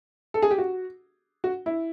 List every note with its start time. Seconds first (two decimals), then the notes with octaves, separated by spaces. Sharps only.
0.34 A4
0.42 G#4
0.51 G4
0.58 F#4
1.44 F#4
1.66 E4